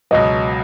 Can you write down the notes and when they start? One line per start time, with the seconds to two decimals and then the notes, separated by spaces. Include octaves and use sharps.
0.11 C#2 B2 F#3 D#5